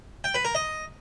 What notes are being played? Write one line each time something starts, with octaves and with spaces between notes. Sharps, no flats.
G5
B4
A#4
D#5